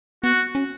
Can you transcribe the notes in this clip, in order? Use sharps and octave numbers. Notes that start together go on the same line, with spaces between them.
B3 F#4
C#4